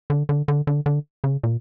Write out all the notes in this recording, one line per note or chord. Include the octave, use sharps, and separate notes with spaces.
D3
D3
D3
D3
D3
C#3
A#2